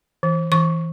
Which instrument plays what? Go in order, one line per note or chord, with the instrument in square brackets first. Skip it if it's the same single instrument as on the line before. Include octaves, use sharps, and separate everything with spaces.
[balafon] E3
E3 C#6